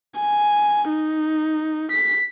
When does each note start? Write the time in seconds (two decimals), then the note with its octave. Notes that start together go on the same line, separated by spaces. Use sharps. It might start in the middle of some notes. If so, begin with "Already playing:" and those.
0.20 G#5
0.89 D#4
1.92 B6